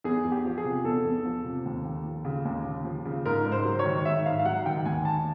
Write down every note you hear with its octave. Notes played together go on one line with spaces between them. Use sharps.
E2 G#4
E2
G4
F3
G#4
C3
E2 A4
E2
F3
C3
D#2
D#2
F3
C#3
D#2
D#2
F3
C#3
G#2 A#4
G#2
C5
F#3
C#5
D#3
G#2 E5
G#2 F5
F5
F#3 F#5
D#3 G5
D#2 G#5
D#2 A5